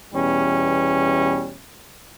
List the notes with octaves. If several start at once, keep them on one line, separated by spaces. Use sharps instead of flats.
E2 B2 G3 C#4